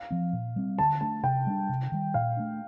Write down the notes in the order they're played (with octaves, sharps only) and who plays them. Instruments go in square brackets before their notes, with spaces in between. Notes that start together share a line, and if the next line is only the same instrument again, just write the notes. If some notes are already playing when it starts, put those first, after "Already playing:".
Already playing: [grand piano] F5
[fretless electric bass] F3 C4
A#2
G3 C4
[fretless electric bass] D3 [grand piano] A5
[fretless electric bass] A3 D4 [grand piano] A5
[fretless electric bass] C3 [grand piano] G5
[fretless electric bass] G3 A#3 D4
C3
D#3 G3
[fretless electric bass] A#2 [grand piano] F5
[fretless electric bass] A3 D4